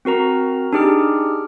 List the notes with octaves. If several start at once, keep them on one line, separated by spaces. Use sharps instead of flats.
C4 F#4 A#4 A#5
D4 D#4 G4 G#4 F6